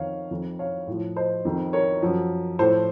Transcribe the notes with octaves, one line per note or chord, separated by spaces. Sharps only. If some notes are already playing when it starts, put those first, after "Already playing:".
Already playing: F2 D#3 C#5 F5
F2 D#3
C#5 F5
A2 F3
C5 D#5
F2 D#3
A#4 C#5
F#2 F3
A2 F3 A4 C5